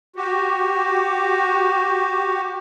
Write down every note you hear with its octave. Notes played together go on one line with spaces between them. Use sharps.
F#4 G4